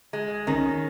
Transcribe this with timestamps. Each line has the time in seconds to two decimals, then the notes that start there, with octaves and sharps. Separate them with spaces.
0.13 G#3
0.47 D#3 C#4